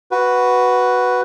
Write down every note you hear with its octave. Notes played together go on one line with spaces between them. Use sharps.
F#4 B4